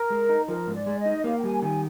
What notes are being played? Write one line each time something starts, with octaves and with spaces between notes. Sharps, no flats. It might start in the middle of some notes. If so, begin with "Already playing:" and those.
Already playing: A#4
G#3
D#4
F3 A#4
G#2
D5
G#3
D#5
D#4
A#3 F5
G5
G3 G#5
D#3 G#5